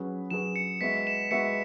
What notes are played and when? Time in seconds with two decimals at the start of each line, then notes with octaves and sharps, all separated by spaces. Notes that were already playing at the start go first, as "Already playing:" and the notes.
Already playing: F#3 C#4 G#4 B4
0.30 F#3 C#4 G#4 B4 E7
0.56 C#7
0.81 G#3 B3 F#4 E5 B6
1.07 E7
1.31 G#3 B3 F#4 E5 C#7